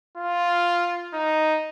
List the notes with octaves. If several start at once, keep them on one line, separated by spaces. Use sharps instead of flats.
F4
D#4